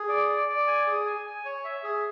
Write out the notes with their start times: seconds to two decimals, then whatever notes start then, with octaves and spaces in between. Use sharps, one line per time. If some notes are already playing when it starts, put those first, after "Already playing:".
Already playing: G#4
0.09 D5
0.29 D5
0.48 D5
0.67 G#5
0.87 G#4
1.06 G#5
1.26 G#5
1.45 C#5
1.65 E5
1.83 G#4